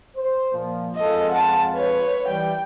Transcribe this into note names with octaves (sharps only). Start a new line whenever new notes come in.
C5
A#2 F3
F2 G#3 F4 A4 D#5
F#5 A5
B4 C#5
E3 G3 G5